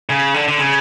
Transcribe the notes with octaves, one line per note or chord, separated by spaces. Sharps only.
C#3
D3
D3
C#3